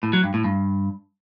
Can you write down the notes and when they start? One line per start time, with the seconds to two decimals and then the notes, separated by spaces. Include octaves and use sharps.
0.03 A2
0.13 F#3
0.24 G2
0.34 A2
0.44 G2